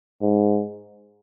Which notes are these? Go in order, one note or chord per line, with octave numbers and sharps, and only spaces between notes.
G#2